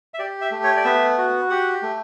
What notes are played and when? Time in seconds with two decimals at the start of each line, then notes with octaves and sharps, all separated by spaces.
0.14 E5
0.19 G4 D5
0.41 E5
0.51 A3
0.63 C#5
0.77 D5
0.84 B3 E5
1.18 F#4
1.50 G4 F#5
1.82 A3